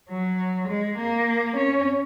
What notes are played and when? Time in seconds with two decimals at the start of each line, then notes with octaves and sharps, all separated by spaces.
0.09 F#3
0.68 G#3
0.98 A#3
1.56 C#4